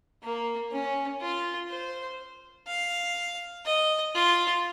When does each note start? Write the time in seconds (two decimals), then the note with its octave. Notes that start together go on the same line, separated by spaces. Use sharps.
0.23 A#3
0.72 C#4
1.21 F4
1.70 C5
2.68 F5
3.66 D#5
4.15 F4